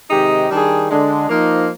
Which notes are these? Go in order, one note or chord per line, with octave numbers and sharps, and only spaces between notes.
C3 D#3 G#3 D#4 G4
D#3 G3 D4 G#4
D3 G#3 D4
F3 A#3 D#4